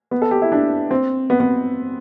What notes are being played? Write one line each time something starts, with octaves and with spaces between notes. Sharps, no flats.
B3
A4
G4
E4
D4
C4
B3
B3